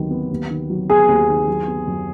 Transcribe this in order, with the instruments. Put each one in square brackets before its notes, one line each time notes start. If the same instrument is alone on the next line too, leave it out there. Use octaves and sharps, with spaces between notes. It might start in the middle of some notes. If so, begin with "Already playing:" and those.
Already playing: [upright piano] D#2 D#3 F#3 B3
B3
D#2
D#3
F#3
[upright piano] B3 [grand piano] G#4
[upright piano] D#2
D#3
F#3
B3
F#2